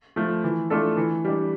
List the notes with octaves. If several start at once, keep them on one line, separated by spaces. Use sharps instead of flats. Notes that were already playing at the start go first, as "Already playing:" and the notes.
F3 A3
E3
A3 D4 F4 A4
E3
G3 D4